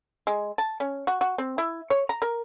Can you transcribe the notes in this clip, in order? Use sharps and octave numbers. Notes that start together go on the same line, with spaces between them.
G#3
A5
C#4
F#4
F#4
C4
E4
C#5
A#5
A#4